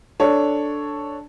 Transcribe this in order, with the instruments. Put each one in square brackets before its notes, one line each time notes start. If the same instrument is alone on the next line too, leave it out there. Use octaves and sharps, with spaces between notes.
[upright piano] D4 A4 C#5